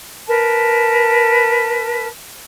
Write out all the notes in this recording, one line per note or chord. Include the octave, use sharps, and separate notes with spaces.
A#4 B4 A5